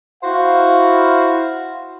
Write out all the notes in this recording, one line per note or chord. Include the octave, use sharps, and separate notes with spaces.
E4 F#4 C5 F5